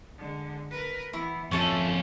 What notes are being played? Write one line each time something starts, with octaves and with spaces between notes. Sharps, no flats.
D3 G#3
A#4 B4
E3 B3 E4
F2 A3 C#4 F4 A4 C#5